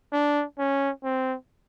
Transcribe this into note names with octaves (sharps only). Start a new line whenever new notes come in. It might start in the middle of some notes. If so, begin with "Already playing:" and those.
D4
C#4
C4